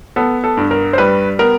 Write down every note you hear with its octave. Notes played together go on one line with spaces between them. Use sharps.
B3 A4
A4
G2
A#4
C5
G3 B4
B3 A#4